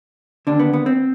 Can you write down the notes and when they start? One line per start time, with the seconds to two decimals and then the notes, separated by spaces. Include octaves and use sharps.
0.47 D#2 D3 D4
0.60 B3
0.73 B3
0.86 C4